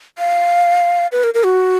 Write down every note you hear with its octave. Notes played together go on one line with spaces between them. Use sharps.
F5
B4
A#4
A#4
F#4